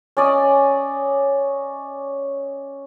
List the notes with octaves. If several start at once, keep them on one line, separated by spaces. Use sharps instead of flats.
C#4 D5 D#5